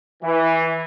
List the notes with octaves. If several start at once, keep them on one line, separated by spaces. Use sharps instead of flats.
E3